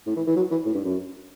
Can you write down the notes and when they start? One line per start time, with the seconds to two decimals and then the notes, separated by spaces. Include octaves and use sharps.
0.07 A2
0.16 E3
0.27 E3
0.36 F#3
0.51 E3
0.66 A2
0.75 G2
0.85 F#2